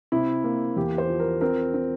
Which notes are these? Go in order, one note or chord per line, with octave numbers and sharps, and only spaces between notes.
C3 E4
A#3
E2 G4
C5
F3
A#4
C4 A#4
C4